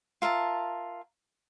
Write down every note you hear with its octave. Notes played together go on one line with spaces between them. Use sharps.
F4 A#4 E5 A5